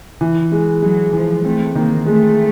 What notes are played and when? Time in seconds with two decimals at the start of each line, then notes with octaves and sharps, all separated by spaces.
0.21 E3
0.52 G#3
0.82 F#3 G#3
1.13 E3 F3
1.45 A3 C4
1.75 D#3 A#3
2.06 G#3 A3